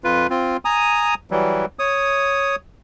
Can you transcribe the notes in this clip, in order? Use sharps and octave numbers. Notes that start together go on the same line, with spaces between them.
F2 F4 B4
C4 F4
G#5 A#5 D#6
E3 F#3 G3
C#5 D#6